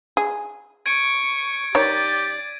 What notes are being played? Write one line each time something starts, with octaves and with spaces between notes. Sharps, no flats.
G#4
C#6 G#6 D7 D#7
D#3 G4 C#5 D5 A6